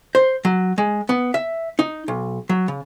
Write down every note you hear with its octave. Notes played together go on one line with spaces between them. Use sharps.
C5
F#3
G#3
B3
E5
D#4
B1
F#3
C#3